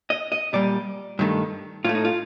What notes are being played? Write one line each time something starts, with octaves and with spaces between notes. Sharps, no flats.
D#5
D#5
A#2 G3 D5
G2 D#3 A3
A2 A3 F4
D#4
F4